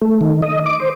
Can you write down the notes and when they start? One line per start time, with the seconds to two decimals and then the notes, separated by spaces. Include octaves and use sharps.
0.02 A3
0.21 D#3
0.42 D#5
0.66 D6
0.80 C5